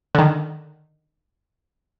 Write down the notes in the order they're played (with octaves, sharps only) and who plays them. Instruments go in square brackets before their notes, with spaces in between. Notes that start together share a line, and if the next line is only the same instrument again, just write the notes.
[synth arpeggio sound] D3 D#3